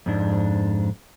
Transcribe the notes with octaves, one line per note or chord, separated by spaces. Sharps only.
F2 G#2 D4